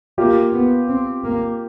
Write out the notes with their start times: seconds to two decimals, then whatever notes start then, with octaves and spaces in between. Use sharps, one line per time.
0.18 A#3 F4 G4
0.53 B3
0.88 C4
1.24 A#3